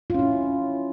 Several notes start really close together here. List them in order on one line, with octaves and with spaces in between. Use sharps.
F4 C#4 E4